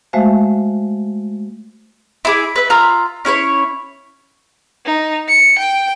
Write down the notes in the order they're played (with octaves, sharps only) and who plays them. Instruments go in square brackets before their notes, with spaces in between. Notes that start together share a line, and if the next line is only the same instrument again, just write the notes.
[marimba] G#3 A3 F#4 C5 E5 F5
[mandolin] E4 G#4 D6
B4 E5
F4 A#5 E6
C#4 E4 C5 C#5
[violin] D#4
C#7
G5